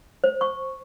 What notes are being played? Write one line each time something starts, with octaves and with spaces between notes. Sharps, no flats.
C5
C#6